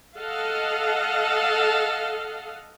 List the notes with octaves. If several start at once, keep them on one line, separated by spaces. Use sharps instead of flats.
A4 D#5 F5 F#5